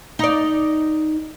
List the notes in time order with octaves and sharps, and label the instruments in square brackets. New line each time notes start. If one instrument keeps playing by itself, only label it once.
[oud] D#4 D5